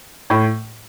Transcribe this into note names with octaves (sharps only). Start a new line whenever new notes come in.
A2